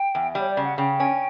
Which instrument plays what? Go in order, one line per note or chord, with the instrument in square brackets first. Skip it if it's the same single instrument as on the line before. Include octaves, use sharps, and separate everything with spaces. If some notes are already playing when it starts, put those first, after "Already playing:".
Already playing: [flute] G5
[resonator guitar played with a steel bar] E2
[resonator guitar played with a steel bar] G3 [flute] C#5
[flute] D5
[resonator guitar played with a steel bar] C#3
[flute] F#5
[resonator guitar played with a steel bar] C#3 [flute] G5
[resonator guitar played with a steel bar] C#4